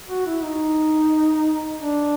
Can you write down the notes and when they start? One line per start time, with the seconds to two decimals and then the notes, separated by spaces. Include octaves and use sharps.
0.09 F#4
0.26 E4
0.43 D#4
1.79 D4